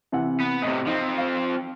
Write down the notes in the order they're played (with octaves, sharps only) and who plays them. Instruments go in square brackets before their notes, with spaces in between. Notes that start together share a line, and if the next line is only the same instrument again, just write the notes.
[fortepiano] C3 E3 F#5
[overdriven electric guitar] B3
[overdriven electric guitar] A2 C3 [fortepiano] D#5
[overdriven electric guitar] F3 C4 [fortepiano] D#4
[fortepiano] F5